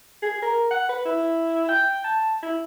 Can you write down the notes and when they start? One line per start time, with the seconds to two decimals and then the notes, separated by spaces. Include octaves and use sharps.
0.22 G#4
0.42 A#4
0.71 F#5
0.89 B4
1.05 E4
1.69 G5
2.04 A5
2.42 E4